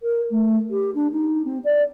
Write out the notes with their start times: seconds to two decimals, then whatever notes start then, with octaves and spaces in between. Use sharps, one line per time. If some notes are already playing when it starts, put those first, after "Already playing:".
0.02 A#4
0.31 A3
0.70 G4
0.94 D4
1.12 D#4
1.44 C4
1.64 D5